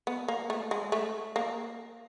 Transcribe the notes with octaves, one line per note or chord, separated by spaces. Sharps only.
B3
A#3
A3
G#3
A3
A#3